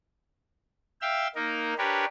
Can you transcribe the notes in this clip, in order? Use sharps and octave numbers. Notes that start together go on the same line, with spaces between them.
E5 F5 G5 E6
A#3 D#4 A#4
D4 G4 A#4 B4 C#5